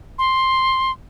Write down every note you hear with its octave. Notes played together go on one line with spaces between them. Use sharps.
C6